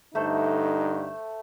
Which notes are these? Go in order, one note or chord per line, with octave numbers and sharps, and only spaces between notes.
G2 D3 A3 D#4 A4 C5